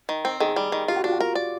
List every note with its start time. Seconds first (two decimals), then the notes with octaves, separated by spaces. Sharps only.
0.09 D#3
0.25 C4
0.40 D#3 G#4
0.56 G3
0.72 D#3
0.88 F4 G4
0.96 F#4
1.04 D4 F4
1.12 F#4
1.20 A#4
1.35 D5